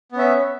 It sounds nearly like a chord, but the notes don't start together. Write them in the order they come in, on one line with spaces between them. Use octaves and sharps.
B3 C#4 E5